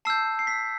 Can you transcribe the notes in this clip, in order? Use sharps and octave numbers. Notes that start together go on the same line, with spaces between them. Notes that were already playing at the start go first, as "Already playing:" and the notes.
A5 E6 G6 C7
C7
B6